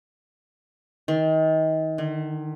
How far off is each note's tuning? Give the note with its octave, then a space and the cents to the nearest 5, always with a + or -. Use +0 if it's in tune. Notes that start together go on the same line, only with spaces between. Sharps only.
D#3 +30
D#3 -45